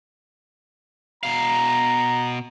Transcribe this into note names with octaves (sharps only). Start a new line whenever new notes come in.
B2 F5 A#5